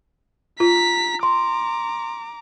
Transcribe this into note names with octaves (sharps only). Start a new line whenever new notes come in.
F4 A#5 B6
A#5 C6 D6